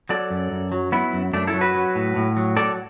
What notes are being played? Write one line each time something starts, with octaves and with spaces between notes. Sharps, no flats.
F#3 A4 D5
F#2
F#2
F#3
F#3 B3 E4
F#2
F#2 A3 D4
E4 A4
F#3
F#4 B4
F#3
A2
A2
F#3
F#3 A4 D5